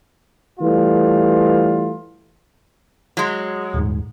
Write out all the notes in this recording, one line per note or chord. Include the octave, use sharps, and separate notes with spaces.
E3 G3 A3 F4
F#3 G#3
D#1 G#2